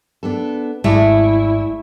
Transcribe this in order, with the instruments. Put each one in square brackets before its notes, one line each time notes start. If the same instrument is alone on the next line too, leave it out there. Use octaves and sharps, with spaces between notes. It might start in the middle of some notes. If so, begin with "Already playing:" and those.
[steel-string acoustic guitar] B3 D4 A4
[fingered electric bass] G#1 [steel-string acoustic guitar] G#3 D5 E5 [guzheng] A3 [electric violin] E4